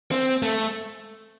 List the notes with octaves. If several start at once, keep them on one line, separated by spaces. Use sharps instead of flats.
C4
A3